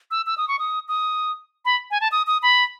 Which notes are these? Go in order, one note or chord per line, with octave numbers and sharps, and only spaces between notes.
E6
E6
D#6
C#6
D#6
D#6
B5
G#5
A5
D#6
D#6
B5